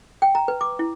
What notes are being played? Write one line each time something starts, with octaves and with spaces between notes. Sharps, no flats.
G5
A#5
B4
D6
E4